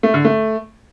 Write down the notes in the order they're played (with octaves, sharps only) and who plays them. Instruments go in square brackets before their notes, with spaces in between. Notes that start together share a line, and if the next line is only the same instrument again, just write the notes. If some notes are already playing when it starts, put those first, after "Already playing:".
[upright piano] A3
D3
A3